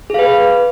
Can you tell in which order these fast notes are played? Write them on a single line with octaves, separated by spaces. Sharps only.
G#4 F5 B4